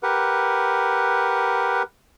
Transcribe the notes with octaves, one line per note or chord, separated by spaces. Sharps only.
G4 A#4 B4 F#5